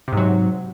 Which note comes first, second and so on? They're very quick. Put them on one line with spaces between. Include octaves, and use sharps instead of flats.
C3 G#2 F#3